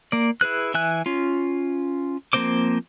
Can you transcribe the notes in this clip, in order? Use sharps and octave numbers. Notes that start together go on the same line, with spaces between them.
A#3 D5
E4 G#4 B4 F#6
E3 E5 G#5 F#6
C#4 F4
F3 A#3 C4 C5 D6